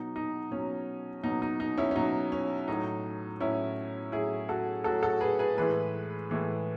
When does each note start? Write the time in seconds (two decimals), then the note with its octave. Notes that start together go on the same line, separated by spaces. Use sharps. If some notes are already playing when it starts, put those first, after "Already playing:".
Already playing: B2 F#3 D#4
0.16 D#4
0.51 B2 F#3 C#4
1.23 B2 F#3 D#4
1.42 D#4
1.60 D#4
1.77 C#4 E4
1.91 C#4
1.96 B2 F#3 D#4
2.32 C#4
2.68 A2 F#3 D#4
3.40 A2 F#3 C#4 E4
4.12 A2 F#3 E4 G#4
4.48 F#4 A4
4.84 A2 F#3 F#4 A4
5.02 F#4 A4
5.21 G#4 B4
5.39 G#4 B4
5.57 A2 E3 G#3 G#4 B4
6.29 A2 E3 G#3